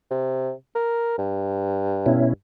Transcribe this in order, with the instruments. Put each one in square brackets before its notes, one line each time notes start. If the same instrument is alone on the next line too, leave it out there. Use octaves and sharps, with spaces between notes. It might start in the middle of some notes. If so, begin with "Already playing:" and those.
[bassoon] C3
A#4
G2
[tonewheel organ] B2 C#4 E4